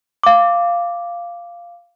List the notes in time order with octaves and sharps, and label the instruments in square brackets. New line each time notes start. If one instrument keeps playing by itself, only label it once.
[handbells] F5 D6